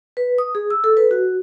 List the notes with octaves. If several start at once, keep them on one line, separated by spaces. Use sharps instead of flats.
B4
D#6
G#4
E6
A4
B4
F#4